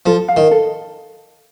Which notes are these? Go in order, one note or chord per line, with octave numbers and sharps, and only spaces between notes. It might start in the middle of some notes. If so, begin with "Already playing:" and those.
F3 A4
F5
D#3
A4